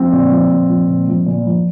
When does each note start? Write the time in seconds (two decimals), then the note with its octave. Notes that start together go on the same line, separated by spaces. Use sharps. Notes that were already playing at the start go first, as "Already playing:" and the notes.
Already playing: F3 C4
0.12 A#2
0.31 F3
0.50 A#2
0.69 F3
0.88 A#2
1.08 F3
1.26 A#2
1.46 F3